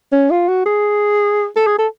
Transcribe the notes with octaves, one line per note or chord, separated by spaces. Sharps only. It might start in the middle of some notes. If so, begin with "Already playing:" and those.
C#4
F4
F#4
G#4
A4
G#4
A4